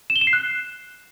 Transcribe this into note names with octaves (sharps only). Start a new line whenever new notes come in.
E7
G7
E7
C7
F#6